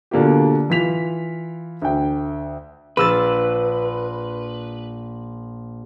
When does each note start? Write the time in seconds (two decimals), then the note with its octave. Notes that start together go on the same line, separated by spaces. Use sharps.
0.11 B2 D3 A#3 F4 G4
0.70 E3 F4 B6 F7
1.82 D2 G5
2.97 A#1 B4 E6 A6